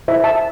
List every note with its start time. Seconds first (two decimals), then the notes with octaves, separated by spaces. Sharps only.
0.08 E4 C5 E5
0.24 E5 A5